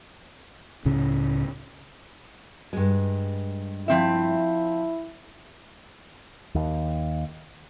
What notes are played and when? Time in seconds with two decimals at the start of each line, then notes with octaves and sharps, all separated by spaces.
0.85 C#2 A2 C#3 C#4
2.73 G2 G#3
3.88 F3 C4 E4 E5
6.55 D#2